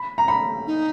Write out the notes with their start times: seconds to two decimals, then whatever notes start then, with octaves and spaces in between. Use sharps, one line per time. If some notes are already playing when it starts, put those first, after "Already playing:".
Already playing: B5
0.18 A#5
0.28 B5
0.67 D#4